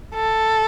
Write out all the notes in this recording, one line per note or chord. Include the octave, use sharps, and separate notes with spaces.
A4